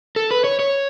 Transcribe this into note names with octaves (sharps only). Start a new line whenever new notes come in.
A4
B4
C#5
C#5